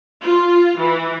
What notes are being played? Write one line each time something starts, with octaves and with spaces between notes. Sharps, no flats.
F4
E3